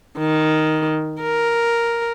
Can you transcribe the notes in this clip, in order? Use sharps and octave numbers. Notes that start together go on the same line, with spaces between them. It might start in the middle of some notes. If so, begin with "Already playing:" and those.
D#3
A#4